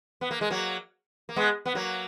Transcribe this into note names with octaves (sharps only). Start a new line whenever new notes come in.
B3
A#3
G#3
F#3 A#3
A#3
G#3 B3
B3
F#3 A#3